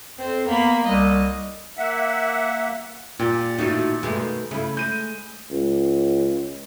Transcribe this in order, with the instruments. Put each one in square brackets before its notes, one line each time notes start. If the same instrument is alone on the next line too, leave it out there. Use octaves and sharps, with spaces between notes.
[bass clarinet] F2 [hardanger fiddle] C4
[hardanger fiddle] A#3 B5 [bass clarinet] B3
[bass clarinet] C2 [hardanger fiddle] D#5
[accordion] A#3 E5 F#5
[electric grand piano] A#2 [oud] G4
[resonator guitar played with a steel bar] A2 D#4 [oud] D#3 F#4
[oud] B2 D#3 A3 [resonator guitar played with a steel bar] G#3
[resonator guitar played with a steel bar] C#3 [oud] A3 E4
[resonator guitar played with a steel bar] G#3 [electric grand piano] G6 D#7
[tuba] C#2